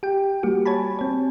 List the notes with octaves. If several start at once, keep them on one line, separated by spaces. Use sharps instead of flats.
G4 G5
G3 A#3 F#4 G4
C#5 G#5 A5 B5
C4 C#5